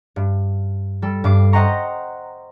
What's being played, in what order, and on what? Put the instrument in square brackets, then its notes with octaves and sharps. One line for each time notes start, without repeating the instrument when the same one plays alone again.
[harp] G2
G3 A4
G2 D6 C7
C5 D#5 F#5 G5 A#5 C#6